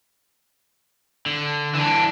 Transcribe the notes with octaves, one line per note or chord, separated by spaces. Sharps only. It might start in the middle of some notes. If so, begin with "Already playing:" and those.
D3
E3 D4